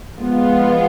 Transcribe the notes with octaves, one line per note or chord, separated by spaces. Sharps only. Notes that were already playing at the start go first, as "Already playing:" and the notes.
F3 G#3 B3 F4